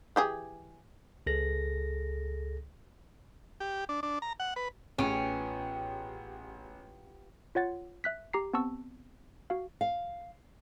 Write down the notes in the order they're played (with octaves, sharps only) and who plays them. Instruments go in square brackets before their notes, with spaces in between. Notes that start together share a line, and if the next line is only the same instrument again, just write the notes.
[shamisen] E3 G4 G#4
[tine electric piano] C#2 G#4 A4 A#6
[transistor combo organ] G4
D4
D4
A#5
F#5
B4
[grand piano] A1 G#4 D7 [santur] B3 F4 G4 [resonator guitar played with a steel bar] C#4
[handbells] F4 C#5 F#5 A6
E5 F#6 B6
G4 A#5 C7
B3 C4 A5 C#6 E6
F#4 F5
[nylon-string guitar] F5